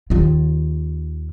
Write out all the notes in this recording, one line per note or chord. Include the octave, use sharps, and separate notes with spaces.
D#2 F4